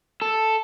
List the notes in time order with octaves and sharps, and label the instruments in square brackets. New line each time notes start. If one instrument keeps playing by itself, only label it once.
[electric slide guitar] A4